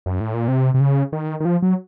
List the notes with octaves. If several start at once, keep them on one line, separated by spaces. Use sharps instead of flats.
F#2
A2
A#2
C3
C3
C#3
D#3
D#3
F3
F#3